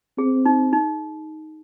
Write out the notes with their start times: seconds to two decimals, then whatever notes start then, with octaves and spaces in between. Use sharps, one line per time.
0.18 C4 G#4
0.46 D#4
0.73 D#4